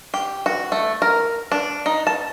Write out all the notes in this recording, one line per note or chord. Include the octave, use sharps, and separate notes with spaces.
G4
F#4
A3
A#4
D4
D#4
A5